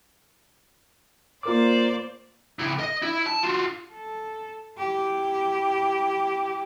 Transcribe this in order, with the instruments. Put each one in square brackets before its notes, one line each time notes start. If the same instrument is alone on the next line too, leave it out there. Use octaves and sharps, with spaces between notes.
[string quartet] A#3 C5 D5 [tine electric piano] F4 A#4 D6
[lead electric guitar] C#2 E4
D#5
E4
A5
F4 F#4
[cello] A4
E4 G4